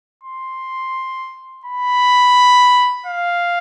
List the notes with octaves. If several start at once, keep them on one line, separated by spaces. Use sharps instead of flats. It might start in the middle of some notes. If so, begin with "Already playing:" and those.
C6
B5
F5